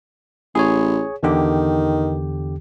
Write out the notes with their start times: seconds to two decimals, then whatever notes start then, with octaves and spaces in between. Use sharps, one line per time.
0.55 A1 G#4 C#5
1.23 E2 D3 D#3 G4